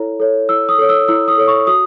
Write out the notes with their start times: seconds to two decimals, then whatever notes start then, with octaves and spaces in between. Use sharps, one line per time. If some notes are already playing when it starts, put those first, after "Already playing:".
Already playing: E4 A4 C#5
0.20 A4 C#5
0.49 E4 E6
0.69 D#6
0.78 A4 C#5
0.89 E6
1.08 E4 E6
1.28 D#6
1.38 A4 C#5
1.48 C#6
1.67 F#4 D#6